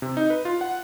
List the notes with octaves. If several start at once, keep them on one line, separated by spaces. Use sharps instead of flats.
C3
D#4
B4
F4
F#5